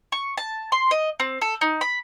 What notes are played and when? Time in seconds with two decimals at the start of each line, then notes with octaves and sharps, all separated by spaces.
0.12 C#6
0.38 A5
0.72 C6
0.91 D#5
1.20 C4
1.41 A4
1.61 D#4
1.81 B5